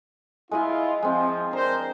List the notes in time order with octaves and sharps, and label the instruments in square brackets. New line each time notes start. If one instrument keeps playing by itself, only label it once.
[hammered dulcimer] G#3 D#5 G#5 [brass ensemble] E4 F4
[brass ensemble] F3 [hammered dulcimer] G#3 C4
[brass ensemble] D4 A#4 C5 [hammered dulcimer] A#5